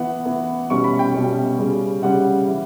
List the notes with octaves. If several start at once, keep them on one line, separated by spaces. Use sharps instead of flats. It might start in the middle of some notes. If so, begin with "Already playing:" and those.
Already playing: E3 B3 F#5
E3 B3
B2 G3 C#4 C#6
B5
G5
B2 G3 C#4
C#3 G3 C#4
C#3 G3 C#4 F#5
E3